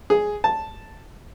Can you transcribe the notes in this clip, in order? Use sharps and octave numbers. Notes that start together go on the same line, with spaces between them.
G#4
A5